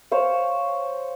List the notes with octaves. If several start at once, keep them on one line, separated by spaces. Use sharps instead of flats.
C5 C#5 F5